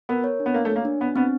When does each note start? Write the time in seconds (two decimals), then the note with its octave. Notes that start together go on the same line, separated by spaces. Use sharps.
0.09 B3 A#4
0.24 C#5
0.40 D4
0.46 B3
0.54 A#3 A#4
0.65 A3
0.70 C#5
0.76 A#3
0.85 D4
1.01 B3 D4
1.16 B3 C4